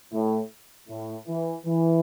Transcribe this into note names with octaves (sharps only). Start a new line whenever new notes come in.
A2
A2
E3
E3